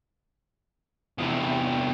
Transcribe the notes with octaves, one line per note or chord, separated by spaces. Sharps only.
E2 C3